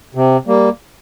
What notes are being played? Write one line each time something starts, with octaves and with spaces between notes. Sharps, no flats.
C3
G3 A#3